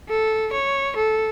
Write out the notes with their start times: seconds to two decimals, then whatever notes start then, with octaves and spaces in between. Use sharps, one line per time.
0.09 A4
0.52 C#5
0.96 A4